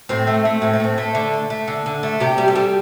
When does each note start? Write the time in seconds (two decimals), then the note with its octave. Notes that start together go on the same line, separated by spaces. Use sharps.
0.09 A2 C4
0.27 A3
0.45 A3
0.62 A2 C4
0.73 A3
0.80 A2 C4
0.98 A3
1.15 D3
1.33 A3
1.50 A3
1.68 D3
1.86 D3
2.03 A3
2.20 C3 G4
2.38 G3
2.48 A4
2.55 G3